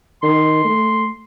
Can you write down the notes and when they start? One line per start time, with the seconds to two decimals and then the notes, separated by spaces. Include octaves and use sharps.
0.23 D#3 C6
0.65 A3